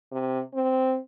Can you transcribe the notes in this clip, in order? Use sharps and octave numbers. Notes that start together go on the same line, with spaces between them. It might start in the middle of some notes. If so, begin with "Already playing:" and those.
C3
C4